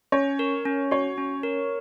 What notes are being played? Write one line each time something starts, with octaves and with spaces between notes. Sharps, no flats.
C#4 C#5
A#4
C#4
F#4 C#5
C#4
A#4